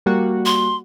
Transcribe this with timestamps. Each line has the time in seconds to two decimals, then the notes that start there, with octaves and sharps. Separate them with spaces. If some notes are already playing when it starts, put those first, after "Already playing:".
0.06 G3 A#3 F#4
0.45 C6